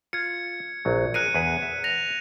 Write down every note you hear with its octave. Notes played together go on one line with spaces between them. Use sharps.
F4 G#6 C#7
A#1 F#3
G#4 A#4 F#6 C#7 D#7
E2 G#4 B4
E5
A#6 F7